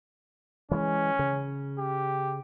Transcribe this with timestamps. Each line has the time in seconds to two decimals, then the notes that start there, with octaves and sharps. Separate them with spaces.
0.71 E3 F3 G#3 C#4
1.19 C#3
1.79 G4